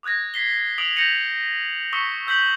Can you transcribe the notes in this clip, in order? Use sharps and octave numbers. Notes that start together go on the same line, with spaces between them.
D6 D#6 F#6 G#6 A#6
B6 C7 G7
D#6 D7 F7 F#7
G6 A#6 B6 C#7 D#7 F7
C#6 D#6 E6 B6 C#7 G7
E6 G6 B6 F#7